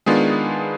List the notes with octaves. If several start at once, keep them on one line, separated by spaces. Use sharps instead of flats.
D#3 G#3 B3 D4 F4 G#4